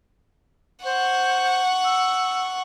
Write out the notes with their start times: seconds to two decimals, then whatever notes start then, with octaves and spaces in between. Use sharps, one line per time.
0.84 C5 F#5 C#6
1.85 E6